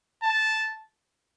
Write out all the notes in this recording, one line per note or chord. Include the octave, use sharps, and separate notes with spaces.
A5